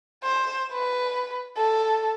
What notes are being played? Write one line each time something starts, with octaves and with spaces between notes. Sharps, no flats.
C5
B4
A4